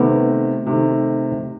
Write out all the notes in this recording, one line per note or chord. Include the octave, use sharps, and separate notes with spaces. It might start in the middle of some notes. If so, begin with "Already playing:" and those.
Already playing: C3 D#3 A3 B3
C3 D#3 A3